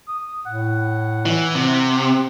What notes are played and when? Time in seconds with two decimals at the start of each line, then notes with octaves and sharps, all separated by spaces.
0.08 D#6
0.46 A2 F#5
1.26 E3
1.55 C3
2.01 C4